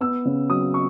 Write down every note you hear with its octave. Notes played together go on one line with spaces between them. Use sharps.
B3 E6
C#3
F#3 D#6
C#6